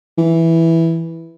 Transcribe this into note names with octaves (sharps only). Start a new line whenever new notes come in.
E3